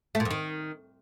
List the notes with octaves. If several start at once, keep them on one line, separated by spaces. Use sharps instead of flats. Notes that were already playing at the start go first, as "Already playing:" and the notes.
A3
A#2
F2
D#3